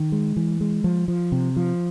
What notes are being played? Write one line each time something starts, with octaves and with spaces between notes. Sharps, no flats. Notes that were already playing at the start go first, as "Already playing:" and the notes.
Already playing: D#3
G#3
E3
G#3
F3
F3
C3
F3